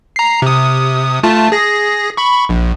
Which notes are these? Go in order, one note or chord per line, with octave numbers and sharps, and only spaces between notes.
A#5 C7
C3 D#6
A3 F4 A5
G#4 A#6
B5 C#6
A#1